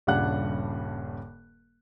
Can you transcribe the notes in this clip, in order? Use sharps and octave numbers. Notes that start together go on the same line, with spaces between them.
D#1 G2 C#3 D4 F#5 F#6